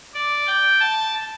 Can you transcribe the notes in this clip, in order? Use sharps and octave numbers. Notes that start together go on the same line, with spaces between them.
D5
G5
A5